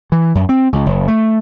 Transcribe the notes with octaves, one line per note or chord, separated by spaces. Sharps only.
E3
F#2
C4
C#2
F#1
A3